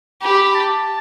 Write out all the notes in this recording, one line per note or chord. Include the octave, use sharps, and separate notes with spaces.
G4 B5
A5